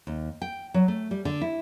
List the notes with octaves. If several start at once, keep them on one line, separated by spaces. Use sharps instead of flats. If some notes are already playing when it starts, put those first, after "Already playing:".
D#2
G5
F#3
A3
G3
D3
E4